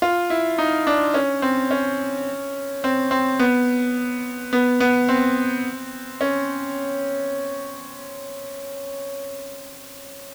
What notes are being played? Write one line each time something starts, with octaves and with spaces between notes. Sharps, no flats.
F4
E4
D#4
D4
C#4
C4
C#4
C4
C4
B3
B3
B3
C4
C#4